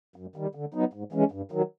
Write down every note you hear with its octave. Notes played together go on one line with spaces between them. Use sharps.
F#2
D#3 G3
D3
F#3 B3 D#4
G#2
E3 G#3 C#4
G2
D#3 F#3